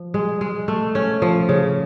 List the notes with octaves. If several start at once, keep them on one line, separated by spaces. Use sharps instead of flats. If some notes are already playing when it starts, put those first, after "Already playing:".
Already playing: F3
G#3
G#3
A3
C#4
F3
C#3